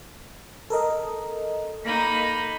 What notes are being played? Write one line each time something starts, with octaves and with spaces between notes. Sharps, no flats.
A4 A#4 D#5
A#3 D#4 B5